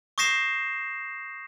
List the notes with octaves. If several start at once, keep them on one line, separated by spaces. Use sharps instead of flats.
C#6 D#6 G6 A#6 C7 E7